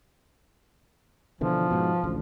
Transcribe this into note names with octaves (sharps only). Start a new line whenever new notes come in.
B2 D3 E3 F3
G#2 B2
A1 D2